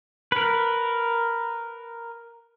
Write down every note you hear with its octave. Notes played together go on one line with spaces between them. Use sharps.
A#4 B4